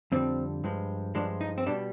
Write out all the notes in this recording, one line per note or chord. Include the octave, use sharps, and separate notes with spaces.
F2 D3 G3 C4
G2 F3 G#3
G2 F3 G#3 D4
D#4
C4
B2 G3 D4